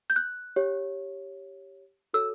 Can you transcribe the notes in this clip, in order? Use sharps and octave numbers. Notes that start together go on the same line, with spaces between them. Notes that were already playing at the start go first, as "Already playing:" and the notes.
G6
F#6
G4 C#5
F#4 A4 C#5 E6